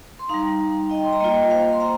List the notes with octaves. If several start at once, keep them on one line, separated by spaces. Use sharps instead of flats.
C6
G3 D#4 F5 A#5
D#5 G5
C6
A#5
A#3 F4 D#5 G5
C5 F5
C6
F5 A#5